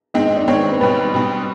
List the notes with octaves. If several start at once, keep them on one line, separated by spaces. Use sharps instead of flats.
D#3 G#3 C4 D#4 D#5
D#5
D5
D#3 G#3 C4 D#4 C#5
C5
B4
B2 G3 C4 B4
B2 G3 C4